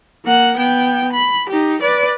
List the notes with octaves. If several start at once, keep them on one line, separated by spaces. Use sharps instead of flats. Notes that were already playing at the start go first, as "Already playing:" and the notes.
A#3 F#5
B3 G5
B5
D#4 G4
B4 D5